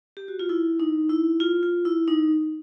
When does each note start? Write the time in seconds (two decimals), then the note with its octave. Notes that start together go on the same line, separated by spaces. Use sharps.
0.17 G4
0.28 F#4
0.39 F4
0.49 E4
0.80 D#4
1.09 E4
1.40 F4
1.63 F4
1.85 E4
2.08 D#4